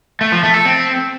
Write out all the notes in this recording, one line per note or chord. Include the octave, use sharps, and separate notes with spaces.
A3
F3
A3
A4
C4